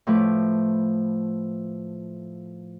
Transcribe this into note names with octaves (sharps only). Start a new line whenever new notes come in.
A2 F3 A3 B4 D6